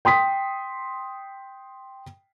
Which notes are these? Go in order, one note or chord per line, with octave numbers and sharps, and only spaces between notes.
G5 C6 D#6 B6